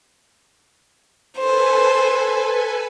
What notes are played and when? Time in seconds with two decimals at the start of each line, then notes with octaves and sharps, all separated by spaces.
1.38 A4 B4 C5 G#5